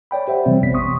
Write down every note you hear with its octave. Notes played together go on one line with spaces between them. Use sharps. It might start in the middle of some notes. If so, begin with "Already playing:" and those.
C#5 D5 G5 B5
G4 C5 E5 F#5
C3 E3 G3 C4
A1 F2 B3 B6
C6 C#6 D#6